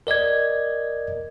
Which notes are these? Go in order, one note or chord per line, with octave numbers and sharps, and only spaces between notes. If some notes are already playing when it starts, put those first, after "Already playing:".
A#4 D5 D#5 G#6